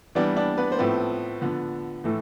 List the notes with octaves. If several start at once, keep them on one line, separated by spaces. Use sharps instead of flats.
E3 G3 B3 D4 D5
D4 D5
B3 B4
C5
A2 F3 A3 B3 C4 B4
D3 F3 B3
A2 E3 A3 A4